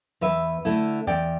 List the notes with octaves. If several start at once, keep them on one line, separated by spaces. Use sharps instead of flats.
E2 B4 E5
D3 A3 E4
E2 D5 G5